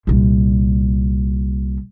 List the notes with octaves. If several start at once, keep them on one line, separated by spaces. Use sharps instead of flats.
C2 A#2